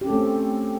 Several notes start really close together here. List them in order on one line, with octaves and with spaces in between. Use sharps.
G4 C#4 A4 A3 C4